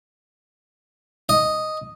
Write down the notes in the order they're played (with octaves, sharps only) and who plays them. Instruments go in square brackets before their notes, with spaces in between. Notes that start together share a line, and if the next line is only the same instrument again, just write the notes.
[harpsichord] D#5